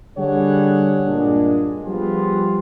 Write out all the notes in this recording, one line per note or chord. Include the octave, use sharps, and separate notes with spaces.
D3 G3 D4 G#4 C#5 F#5
G2 A#2 G#3 D4
F3 G3 B3 F4 G4 G#4